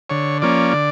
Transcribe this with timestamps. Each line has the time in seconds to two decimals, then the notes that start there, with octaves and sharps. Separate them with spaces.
0.10 D3 C#5
0.42 F3 A#3 C#4 D5
0.73 D3